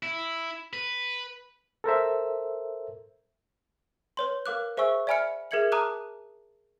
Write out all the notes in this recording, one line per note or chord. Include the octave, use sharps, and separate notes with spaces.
E4
B4
A4 A#4 C5 E5
B4 C#5 C6
A#4 F5 D6 F#6
G#4 C5 E5 G#5 C#6 E6
D5 E5 G#5 B5 F6 C#7
G#4 A#4 E5 G#6 C#7 F#7
A5 A#5 D6 D#6 F6 F#6